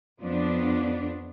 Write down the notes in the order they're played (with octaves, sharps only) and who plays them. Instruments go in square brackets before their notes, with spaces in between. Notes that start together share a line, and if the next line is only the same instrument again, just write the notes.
[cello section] F2 F3 B3 D4